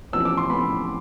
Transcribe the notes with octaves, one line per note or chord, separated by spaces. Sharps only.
A1 A2 F3 B3 E6
D6
C6
A1 A2 F3 B3 B5